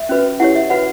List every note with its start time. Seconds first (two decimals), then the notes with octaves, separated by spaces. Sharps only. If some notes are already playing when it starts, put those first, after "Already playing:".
Already playing: E5
0.09 C#4 F#4 B4
0.40 E4 G4 C#5 F#5
0.55 E5
0.70 F#4 B4 F#5